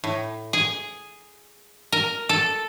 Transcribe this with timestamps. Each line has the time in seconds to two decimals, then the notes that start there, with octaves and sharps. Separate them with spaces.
0.04 A2
0.53 G#4
1.92 A#4
2.29 A4